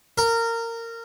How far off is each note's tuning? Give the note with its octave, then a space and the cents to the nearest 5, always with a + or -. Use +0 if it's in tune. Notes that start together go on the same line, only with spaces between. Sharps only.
A#4 -20